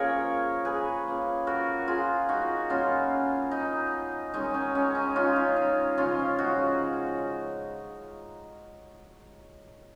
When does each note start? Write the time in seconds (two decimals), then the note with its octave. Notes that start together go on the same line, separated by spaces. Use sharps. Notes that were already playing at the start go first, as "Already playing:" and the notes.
Already playing: F3 A#3 C#4 G#4 A#4 C#5
0.65 G#4 B4
1.06 F3 A#3 C#4
1.47 F#4 A#4
1.88 F4 G#4
2.29 D#4 F#4
2.69 A#2 F#3 B3 C#4 F4
3.51 D#4
4.34 D#3 G#3 C#4 D#4
4.54 C#4
4.75 C#4
4.95 D#4
5.16 C#4 F4
5.36 D#4
5.56 D#4
5.97 C#3 F3 G#3 C#4 F4
6.39 D#4 F#4